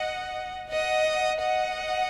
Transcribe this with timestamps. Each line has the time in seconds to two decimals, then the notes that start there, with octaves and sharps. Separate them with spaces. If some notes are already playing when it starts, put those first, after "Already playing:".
Already playing: D#5 F#5
0.69 D#5 F#5
1.39 D#5 F#5